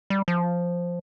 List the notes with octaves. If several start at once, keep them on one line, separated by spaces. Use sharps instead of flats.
G3
F3